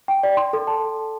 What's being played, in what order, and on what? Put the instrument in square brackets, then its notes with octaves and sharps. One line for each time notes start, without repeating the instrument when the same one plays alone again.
[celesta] G5
D5
C6
A4
A5